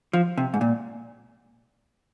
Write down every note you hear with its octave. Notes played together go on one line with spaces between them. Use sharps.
F3
C3
G#2
A#2